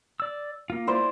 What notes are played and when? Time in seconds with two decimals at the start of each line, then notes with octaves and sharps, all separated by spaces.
0.20 D5 E6
0.70 A#3 F4
0.87 E4 C5 D5